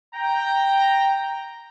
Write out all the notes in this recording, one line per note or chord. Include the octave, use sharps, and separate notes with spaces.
G5 A#5